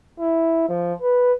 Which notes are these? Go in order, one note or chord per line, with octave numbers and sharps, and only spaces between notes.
E4
F3
B4